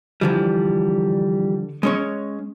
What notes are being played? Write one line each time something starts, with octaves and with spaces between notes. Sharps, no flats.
D3 E3 F3 G3
G#3 C#4 C#5